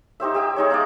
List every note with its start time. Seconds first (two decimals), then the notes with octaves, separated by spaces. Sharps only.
0.20 D#4 G4 C5 E5
0.35 G4 E5 G5
0.56 G#3 D#4 C#5
0.70 D5 E5 F5 A#5